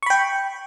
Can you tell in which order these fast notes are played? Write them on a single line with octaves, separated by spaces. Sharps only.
C#6 B5 G5